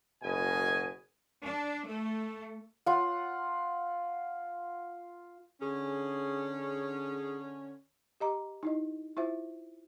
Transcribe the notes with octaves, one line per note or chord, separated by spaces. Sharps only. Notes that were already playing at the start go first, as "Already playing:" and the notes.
F#1 B2 D#5 G#5
D4
A3
F4 F#5
D3 C#4 G#4
G4 D#5 A#5 D6
D#4 E4 D#5
E4 F4 C5 E5